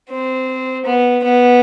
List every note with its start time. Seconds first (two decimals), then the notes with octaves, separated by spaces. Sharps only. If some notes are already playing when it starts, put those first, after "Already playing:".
0.10 C4
0.86 B3
1.24 B3